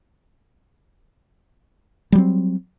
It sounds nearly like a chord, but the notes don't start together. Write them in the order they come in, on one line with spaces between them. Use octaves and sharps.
G3 F#3 C4